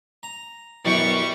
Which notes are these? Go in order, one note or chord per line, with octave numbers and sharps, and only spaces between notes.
A#5
F#2 B2 E3 D5 G5 C#6